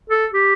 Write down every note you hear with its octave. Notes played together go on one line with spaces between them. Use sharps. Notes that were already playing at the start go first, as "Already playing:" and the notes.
A4
G4